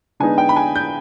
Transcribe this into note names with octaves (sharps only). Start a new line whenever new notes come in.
D3 G#3 B3 D#4 G#5
G5
B5
G#5
G6